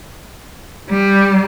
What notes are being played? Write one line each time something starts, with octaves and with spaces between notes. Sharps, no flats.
G3